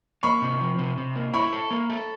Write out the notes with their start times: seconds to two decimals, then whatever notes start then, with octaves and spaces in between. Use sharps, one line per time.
0.23 A#3 B5 C#6
0.42 C3
0.61 F3
0.79 C3
0.98 C3
1.16 A#3
1.33 E4 B5 C#6
1.53 A4
1.71 A#3
1.90 A4